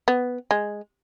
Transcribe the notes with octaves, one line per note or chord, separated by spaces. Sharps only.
B3
G#3